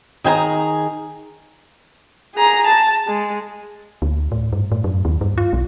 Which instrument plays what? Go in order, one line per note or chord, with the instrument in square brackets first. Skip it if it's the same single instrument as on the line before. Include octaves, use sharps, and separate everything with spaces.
[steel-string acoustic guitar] D#3 G#4 G5 A#5
[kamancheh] G#4 A#5
A5
G#3
[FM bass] D2
A2
G2
A2
F#2
D#2
G2
F4
B1